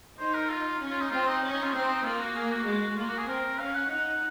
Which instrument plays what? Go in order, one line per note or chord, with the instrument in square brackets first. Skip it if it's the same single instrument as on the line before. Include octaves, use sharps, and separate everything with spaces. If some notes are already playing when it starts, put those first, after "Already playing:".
[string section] D#4 [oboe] C5
[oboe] A#4
F4
[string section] C#4
[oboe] F4
D#4
[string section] C4 [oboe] F4
[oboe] D#4
[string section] C#4
[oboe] D#4
F4
[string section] C4 [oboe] D#4
[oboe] D#4
[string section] A#3 [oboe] F4
[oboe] F#4
G#4
F#4
[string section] G#3
[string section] A#3 [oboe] F4
[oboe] F#4
G#4
[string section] C4 [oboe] A#4
[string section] C#4 [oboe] F5
[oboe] F#5
[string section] D#4 [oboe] F#5